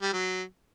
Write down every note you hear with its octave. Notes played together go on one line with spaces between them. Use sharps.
G3
F#3